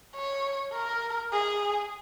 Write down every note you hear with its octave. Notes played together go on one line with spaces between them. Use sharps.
C#5
A#4
G#4